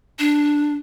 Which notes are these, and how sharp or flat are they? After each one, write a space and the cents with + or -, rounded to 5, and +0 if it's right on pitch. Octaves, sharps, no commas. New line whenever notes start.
D4 +0